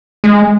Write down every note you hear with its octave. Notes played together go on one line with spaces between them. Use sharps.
G#3